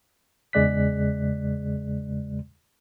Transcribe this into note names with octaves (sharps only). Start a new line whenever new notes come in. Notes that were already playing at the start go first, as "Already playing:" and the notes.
E2 C#3 G#3 D5 F#6 B6